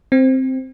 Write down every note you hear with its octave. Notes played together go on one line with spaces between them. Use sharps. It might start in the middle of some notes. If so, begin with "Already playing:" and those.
C4